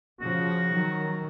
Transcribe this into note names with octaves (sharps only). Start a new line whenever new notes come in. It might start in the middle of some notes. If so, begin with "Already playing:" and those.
C#3 F3 F#4
D#3 F#3